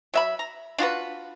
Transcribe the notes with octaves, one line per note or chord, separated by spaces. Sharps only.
F#3 E5 B5
A#5
D4 F4 F#4 B4